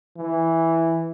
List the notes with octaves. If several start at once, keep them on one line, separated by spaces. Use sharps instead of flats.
E3